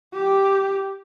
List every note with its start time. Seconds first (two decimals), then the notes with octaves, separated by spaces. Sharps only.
0.13 G4